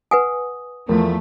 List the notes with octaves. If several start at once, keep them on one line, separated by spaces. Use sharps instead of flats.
B4 F#5 G#5 D#6
E2 F3 A3 A#4